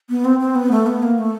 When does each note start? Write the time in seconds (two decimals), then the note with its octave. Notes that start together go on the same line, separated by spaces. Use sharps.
0.10 B3
0.25 C4
0.39 C4
0.55 B3
0.71 A3
0.87 B3
1.03 A#3
1.18 A3